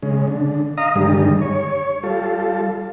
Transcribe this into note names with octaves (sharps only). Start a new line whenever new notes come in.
C#3 G#3
D3
D#5 F5 A#5 D#6
G2 D3 D#3 G3 G#3
C#5
G3 F4 A4